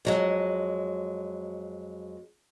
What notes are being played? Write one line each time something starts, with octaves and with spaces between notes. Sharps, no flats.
F2 F#3 G#3